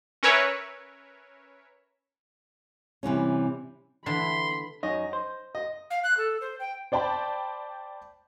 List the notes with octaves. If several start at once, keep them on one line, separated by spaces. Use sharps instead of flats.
C#4 A#4 B4 C#5 E5
C3 E3 G3 C#4
D3 E3 B5 C6
F#2 D#4 C#5 D#5
C5
D#5
F5
F#6
A4
C5
G5
C5 D5 G5 A5 B5